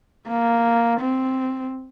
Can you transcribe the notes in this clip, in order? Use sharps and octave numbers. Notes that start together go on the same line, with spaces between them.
A#3
C4